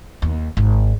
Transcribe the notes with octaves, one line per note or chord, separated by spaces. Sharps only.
D#2
G#1